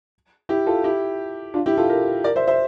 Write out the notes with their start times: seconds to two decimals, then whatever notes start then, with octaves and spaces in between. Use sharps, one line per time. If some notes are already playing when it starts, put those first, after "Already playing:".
0.49 E4 G4
0.67 F4 A4
0.84 E4 G4
1.54 D4 F4
1.66 E4 G4
1.77 F4 A4
1.89 G4 A#4
2.24 A#4 D5
2.36 C5 E5
2.47 C5 E5